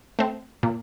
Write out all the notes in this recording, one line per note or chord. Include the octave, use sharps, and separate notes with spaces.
A3 C4
A#2